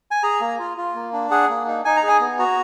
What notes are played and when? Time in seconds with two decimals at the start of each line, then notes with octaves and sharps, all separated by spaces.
0.11 G#5
0.23 G#4 A#5
0.41 A#3
0.59 F4
0.78 F4
0.95 A#3
1.13 D4
1.31 G#4 F#5
1.49 A#3
1.67 D#4
1.85 D#4 G#5
1.97 A#5
2.03 G#4 G#5
2.21 B3
2.39 F#4 A#5